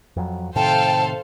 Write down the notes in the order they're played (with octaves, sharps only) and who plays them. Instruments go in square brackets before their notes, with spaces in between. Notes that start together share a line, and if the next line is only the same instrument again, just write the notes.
[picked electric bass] F2 F#3
[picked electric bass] A2 C3 D#3 [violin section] A4 C5 F5 [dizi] G5 [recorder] A5